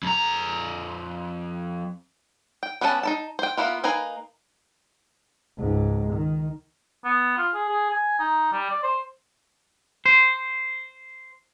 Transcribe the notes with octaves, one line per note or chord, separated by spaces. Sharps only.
F2 A#5
G5
G3 B3 C#4 A#4 A5
D#4 E4 A5
C5 G5
A#3 B3 E4 F4
A#3 D#4 B4 G#5 A#5
C#2 G#2
D#3
B3
F4
G#4
G#4
G#5
D#4
G3
D5
C5
C5